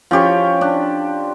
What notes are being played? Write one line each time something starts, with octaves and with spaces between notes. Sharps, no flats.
F3 C#4 G4 C#5
D4